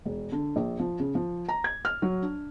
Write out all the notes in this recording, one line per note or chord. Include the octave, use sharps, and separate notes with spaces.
E1
D3
A#1
F3
C#3
F3
A#5
G#6
F6
F#3
D4